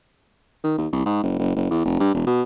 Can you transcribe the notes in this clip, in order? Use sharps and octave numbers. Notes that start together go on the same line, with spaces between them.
D#3
D#2
C2
G#2
F#1
F#1
F#1
E2
F1
G2
E1
B2